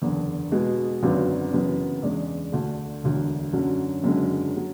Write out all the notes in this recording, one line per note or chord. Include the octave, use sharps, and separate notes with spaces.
F#1 E2 D3
B2 G#3 B3
G#1 F#2 D3 F#3 B3
F#1 F#2 C#3 E3 B3
E2 C#3 G#3 D4
D2 D3 A3
E1 D2 D3
F#2 D3 F#3 C#4
F#1 F#2 D3 G#3 C#4
F#3